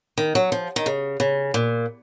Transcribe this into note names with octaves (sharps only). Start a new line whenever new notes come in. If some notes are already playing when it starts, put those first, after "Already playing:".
D#3
F#3
F3
D#3
C#3
C#3
A#2